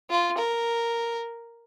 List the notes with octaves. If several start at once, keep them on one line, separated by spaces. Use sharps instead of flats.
F4
A#4